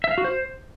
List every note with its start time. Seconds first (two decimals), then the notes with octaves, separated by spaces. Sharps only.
0.04 E5
0.11 F5
0.18 F#4
0.24 C5